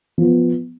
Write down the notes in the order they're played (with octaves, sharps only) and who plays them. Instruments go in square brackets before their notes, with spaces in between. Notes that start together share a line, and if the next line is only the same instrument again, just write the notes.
[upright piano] F3 B3